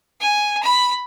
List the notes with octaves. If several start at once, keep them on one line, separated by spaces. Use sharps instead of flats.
G#5
B5